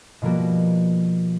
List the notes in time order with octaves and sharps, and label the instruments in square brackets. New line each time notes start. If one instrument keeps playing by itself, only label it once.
[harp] B2 F3 G3 A#3 F#4